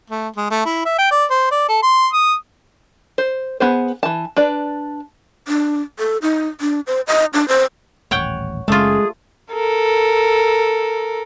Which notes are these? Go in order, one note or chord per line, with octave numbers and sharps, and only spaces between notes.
A3
G#3
A3
E4
E5
G5
D5
C5
D5
A4
C6
D#6
C5
B3 G#4 C5
E3 A5
D4 B4 D5
D4
A4
D#4
D4
C5
D#5
D4
C5
D#1 A1 C#5 F#5 G5
F#1 C#3 G#3 A3 F4 G#4
A4 A#4